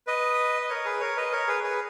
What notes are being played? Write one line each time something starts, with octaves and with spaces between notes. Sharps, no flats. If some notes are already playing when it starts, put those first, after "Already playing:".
B4 D#5
D#5
A#4 C#5
G#4 B4
A#4 C#5
B4 D#5
A#4 C#5
G#4 B4
G#4 B4